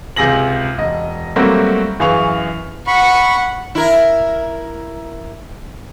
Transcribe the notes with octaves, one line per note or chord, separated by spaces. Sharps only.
C#2 C3 G#4 A#6 F#7
E1 D#5
F#3 G3 A3 A#3 C4 F#4
F#2 E3 G#4 F5 C#6 F7
F#5 B5 C#6
E4 A#4